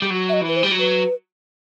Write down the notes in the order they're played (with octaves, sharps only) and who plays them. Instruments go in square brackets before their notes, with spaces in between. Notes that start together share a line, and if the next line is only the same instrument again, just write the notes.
[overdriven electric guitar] G3
F#3
[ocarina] E5
D#5
[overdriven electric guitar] E3
[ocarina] B4
C5
[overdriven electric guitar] G3
F#3
[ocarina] B4